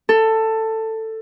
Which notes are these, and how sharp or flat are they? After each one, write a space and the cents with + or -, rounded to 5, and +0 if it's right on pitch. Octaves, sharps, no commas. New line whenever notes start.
A4 +15